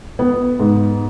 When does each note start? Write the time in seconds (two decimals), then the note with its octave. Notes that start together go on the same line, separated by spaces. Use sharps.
0.19 B3
0.59 G#2